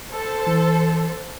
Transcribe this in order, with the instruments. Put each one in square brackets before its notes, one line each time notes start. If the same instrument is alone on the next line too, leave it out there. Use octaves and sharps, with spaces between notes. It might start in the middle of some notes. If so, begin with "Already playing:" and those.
[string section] A4 C5
[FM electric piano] E3